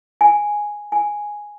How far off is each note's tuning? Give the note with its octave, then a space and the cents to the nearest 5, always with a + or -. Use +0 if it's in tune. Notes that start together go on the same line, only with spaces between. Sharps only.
G#5 +0
G#5 +0